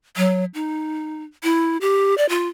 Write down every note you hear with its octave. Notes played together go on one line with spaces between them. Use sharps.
F#3
D#4
E4
G4
D5
F4